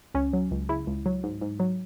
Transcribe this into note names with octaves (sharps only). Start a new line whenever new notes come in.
C#2 C#4
F#3
C#2
C#3 E4
C#2
F#3
G#2
G#2
F#3